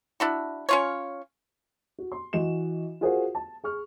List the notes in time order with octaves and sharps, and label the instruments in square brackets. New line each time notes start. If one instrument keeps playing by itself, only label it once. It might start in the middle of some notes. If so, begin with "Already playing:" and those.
[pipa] D4 E4 F#4
C#4 F4 C#5
[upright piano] F#4
C6
E3 F#4 D#5 E7
F4 F#4 G#4 A#4 C5 F#5
A5
G#4 C#6 F6